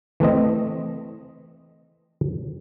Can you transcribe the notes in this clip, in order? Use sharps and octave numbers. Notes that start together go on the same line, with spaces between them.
E3 A3 C4 D#5